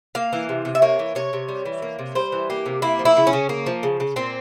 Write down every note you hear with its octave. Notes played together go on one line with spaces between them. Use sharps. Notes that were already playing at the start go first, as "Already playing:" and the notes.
A#3 F5
E3
C3
C3
E5
A#3 C#5
E3
C3 C#5
C3
G3
E3
A#3
C3
G3 C5
E3
A#3 G4
C3
A#3 E4
F3
E4
C#3
C#4
C#3
A#3
F3
C#3
C#3
A#2 C4